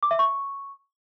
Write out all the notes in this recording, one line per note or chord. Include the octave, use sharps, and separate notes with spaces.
D6
E5
C#6